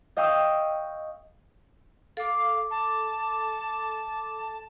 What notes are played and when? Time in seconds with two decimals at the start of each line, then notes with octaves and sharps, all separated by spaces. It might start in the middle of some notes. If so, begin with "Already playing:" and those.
0.17 D#5 F5 G5 C#6 D#6 E6
2.17 A4 F5 D6
2.71 A5